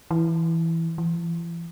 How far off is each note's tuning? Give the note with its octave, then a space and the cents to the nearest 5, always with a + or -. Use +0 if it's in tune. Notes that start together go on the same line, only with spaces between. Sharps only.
E3 +0
E3 +40